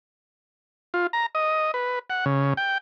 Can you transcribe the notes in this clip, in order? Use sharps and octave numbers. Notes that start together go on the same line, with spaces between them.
F4
A#5
D#5
B4
F#5
C#3
G5